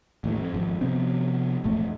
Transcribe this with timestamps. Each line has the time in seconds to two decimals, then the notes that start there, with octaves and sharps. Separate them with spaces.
0.24 A1 D#2 A2
0.41 F2
0.54 G#1 F2
0.81 C3 F3 B3 C4
1.64 E1 A1 F2 A3